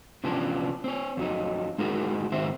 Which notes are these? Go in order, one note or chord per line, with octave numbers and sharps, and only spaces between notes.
C3 E3 F3 B3 C#4 D4
C4 C#5
F2 F#3 D#4
G#3 D#4 E4 F#4 G#4 A#4
G#2 D#3 F#3 C4 C5 E5